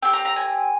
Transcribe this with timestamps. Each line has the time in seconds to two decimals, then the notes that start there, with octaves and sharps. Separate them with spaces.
0.02 C4 G4 G5
0.13 A#5
0.25 A#5
0.36 G#5